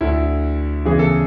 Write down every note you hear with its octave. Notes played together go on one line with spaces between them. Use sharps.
D2 D3 E4
E2 C#3 E3 G#4
A4